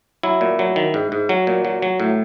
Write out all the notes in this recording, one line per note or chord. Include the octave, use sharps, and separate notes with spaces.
F#3 E4
A#2
F#3
D#3
G#2
G#2
F#3
A#2
F#3
F#3
A2